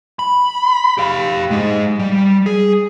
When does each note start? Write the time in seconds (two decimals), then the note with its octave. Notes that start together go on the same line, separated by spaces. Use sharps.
0.19 B5
0.98 G4 F5
1.51 G#3 D#4
1.99 G3
2.46 G#4